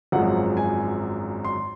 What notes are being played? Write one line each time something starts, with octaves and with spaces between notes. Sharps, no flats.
G#1 F#2 F3 G#3 F#5
G#5
C6